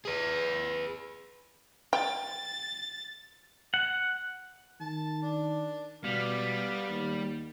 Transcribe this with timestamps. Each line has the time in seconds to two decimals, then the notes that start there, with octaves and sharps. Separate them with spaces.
0.05 G#4 B4
1.93 G5 A6
3.74 F#5
4.80 D#3 A5
5.23 D4
6.04 B2 G3 B3 F5
6.89 D#2